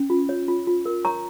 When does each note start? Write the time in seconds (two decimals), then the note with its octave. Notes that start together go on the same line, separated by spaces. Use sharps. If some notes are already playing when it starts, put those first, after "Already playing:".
Already playing: C#4
0.10 F4
0.29 C#5
0.48 F4
0.67 F4
0.86 A#4
1.05 C#5 A#5 C#6